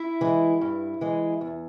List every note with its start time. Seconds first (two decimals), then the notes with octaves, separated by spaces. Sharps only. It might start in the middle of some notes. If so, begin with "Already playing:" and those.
Already playing: E4 E5
0.21 E3 G#3
0.61 G2
1.01 E3 G#3
1.41 E2